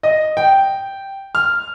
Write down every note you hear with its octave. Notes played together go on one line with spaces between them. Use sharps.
D#5
G5
F6